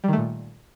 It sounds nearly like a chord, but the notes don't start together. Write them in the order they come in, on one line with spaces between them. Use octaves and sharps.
G3 D#3 A3 A#2